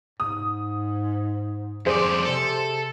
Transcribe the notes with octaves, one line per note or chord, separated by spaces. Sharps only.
G#2 D#6
F2 G#4 C5 D5
C3 A4